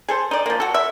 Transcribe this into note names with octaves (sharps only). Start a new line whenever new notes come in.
G#4 A4 C5
D#4 D5
F3 A#3
F#4 A4
E5